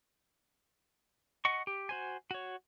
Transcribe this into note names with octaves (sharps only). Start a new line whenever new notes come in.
D#5 F#5 C#6
G4
F#4 C5 G#5
F#4 C#5